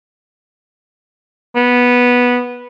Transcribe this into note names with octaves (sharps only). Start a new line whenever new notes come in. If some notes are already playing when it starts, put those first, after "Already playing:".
B3